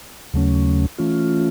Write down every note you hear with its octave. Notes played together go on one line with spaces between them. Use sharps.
D#2 C#3 F#3 A3 C#4
E3 A3 C#4 F4